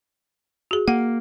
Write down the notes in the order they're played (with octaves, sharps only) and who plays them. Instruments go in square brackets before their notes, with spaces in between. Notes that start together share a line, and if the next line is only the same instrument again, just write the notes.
[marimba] F#4 G#4
[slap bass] A#3 [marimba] F#5